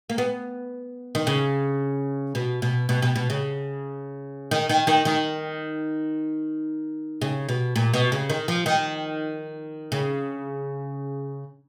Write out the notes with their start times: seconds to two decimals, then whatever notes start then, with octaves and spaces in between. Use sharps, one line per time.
0.10 A#3
0.18 B3
1.15 D#3
1.27 C#3
2.35 B2
2.62 B2
2.89 B2
3.02 B2
3.16 B2
3.30 C#3
4.51 D#3
4.69 D#3
4.87 D#3
5.05 D#3
7.21 C#3
7.49 B2
7.76 A#2
7.94 B2
8.12 C#3
8.30 D#3
8.48 F3
8.66 D#3
9.92 C#3